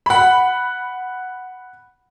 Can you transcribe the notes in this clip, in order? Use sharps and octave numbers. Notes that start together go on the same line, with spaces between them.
F#5 B5